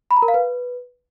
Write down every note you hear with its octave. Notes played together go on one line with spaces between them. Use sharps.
B5
A#5
A#4
F5
B4